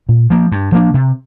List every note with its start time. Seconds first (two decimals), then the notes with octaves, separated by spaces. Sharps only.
0.09 A#2
0.30 F3 A#3
0.52 G2
0.72 F3 A#3 D4
0.94 C3